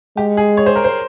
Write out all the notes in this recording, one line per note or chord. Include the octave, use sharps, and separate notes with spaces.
G#3 G4
G#4
C#5
C5
A#4
C5